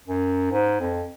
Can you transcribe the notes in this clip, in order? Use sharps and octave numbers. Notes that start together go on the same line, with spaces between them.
F#2
G#2
F2